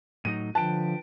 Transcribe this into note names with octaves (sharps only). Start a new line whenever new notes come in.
A2 F#3 D#4 D#7
D3 F3 B4 G5 A5